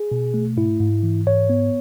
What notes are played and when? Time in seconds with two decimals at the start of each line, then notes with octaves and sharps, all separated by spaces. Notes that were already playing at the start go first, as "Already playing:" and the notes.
Already playing: G#4
0.12 B2
0.34 A3
0.57 G#2 E4
0.80 G#2
1.03 E3
1.26 G#2 C#5
1.50 B3